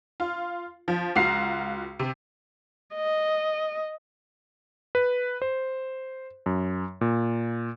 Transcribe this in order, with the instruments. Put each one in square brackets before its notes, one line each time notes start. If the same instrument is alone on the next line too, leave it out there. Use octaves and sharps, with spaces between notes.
[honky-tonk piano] F4
F3
C#2 F4 F#4 A#5 C7
C3
[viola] D#5
[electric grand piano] B4
C5
F#2
A#2